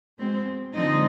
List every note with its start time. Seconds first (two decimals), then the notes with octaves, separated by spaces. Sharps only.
0.18 B2 G#3 C4
0.75 D3 F3 G#3 C4 D#4 D#5